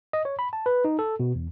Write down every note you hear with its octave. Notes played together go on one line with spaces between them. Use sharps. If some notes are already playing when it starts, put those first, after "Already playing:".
D#5
C#5
B5
A5
B4
D#4
A4
B2
E2